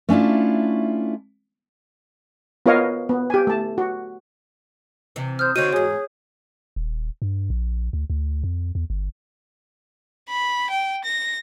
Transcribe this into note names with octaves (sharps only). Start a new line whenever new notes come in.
A3 C#4 D4 E4 F4
B3 F4 A#4 C#5 D#5 F5
B3
G4 G#5
A3 A5
F#4
C3 E3
C5 D#6 F6 G6
D3 C4 D#4 F#4 C#5 G6 D#7
E2 G#2 G#4 C#5
D#1
G2
A#1
D2
D2
F2
E2
G1
B5
G5
A#6